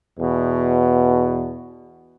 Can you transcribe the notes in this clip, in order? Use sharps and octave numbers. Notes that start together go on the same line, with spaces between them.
E2 B2